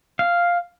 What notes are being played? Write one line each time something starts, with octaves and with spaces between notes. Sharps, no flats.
F5